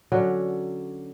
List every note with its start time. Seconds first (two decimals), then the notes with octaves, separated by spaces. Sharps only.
0.12 D3 F#3 C#4